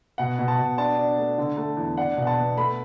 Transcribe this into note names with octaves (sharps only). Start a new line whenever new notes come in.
B2 F#5
B2
A5
B2
D4 A5
D4
A3
D3
A3
E2
D4 F#5
B2
F#5
A5
B3
A3 B5